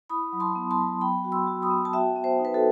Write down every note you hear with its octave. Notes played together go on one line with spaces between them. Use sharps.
E4 B5 D#6
F#3
A5 C6
B3
A5 C6
F#3
B3 G5 B5
F#4
C6 E6
F#4
B5 D#6
B3
A5
F#4 E5 G5
B3
C5 E5
D#4
B4
F#4 A4